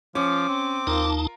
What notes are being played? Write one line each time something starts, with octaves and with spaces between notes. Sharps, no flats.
F3 C#4 D6
C4
D#2 D#4 F4 A#4 A5